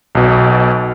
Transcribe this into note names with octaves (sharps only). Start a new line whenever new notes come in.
B1 B2